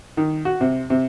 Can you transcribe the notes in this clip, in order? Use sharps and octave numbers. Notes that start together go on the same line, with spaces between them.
D#3
F#4
C3
C3